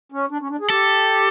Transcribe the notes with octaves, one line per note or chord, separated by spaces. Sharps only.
C#4
D4
C#4
D4
G#4
G4 A4